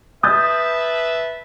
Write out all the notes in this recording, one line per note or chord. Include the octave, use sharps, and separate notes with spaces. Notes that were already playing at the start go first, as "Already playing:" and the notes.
B4 E5 A5 D#6 G6 A6